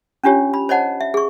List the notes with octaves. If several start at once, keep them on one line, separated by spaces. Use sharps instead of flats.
C#4 D4 F4 G4 C#5
B5
C5 C#5 D#5 F#5 A5
E5
G#4 C#6